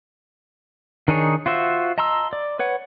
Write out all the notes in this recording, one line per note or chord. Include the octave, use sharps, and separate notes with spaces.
D#3 D4 D#4 G#4 C#5
F4 F#4 C5 E5
D#5 A5 A#5 C6 E6
D5
B4 C#5 F#5